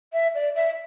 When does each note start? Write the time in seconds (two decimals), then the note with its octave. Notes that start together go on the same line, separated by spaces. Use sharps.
0.13 E5
0.34 D5
0.55 E5